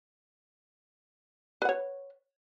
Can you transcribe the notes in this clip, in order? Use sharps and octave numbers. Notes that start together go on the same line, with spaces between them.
B4 C#5 F#5